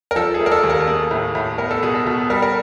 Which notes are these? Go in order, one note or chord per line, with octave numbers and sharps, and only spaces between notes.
A#4
F3 A4
G#4
A3
A#4
A4
D#2
A#4
A#3 G#4
A2
A2
B3 A#4
A4
B2 G#4
A4
B2
G3 A#4
A#4